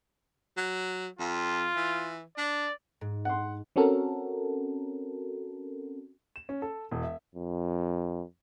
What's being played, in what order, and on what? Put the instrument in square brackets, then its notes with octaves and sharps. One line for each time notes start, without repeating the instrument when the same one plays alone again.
[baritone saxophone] F#3
[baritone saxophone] F2 [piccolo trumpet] F4
[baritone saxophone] E3
[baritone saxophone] D4 [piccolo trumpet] D5
[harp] G#2
[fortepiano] F#5 C6
[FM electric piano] C4 C#4 F#4 A4 A#4
[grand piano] E7
C#4
A4
E1
E5
[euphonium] F2